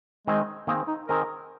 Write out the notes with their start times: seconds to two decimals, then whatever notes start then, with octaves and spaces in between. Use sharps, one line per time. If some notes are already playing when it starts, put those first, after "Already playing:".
0.27 D#3 G#3 C4 G#4 D#5
0.67 D#3 A#3 C4 G#4 D#5
0.88 D#4
1.08 D#3 C4 G#4 A#4 D#5